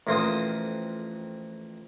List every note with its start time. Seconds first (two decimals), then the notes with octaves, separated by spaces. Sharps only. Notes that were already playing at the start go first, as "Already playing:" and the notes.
0.07 A1 F2 A#3 C4 C5 D#6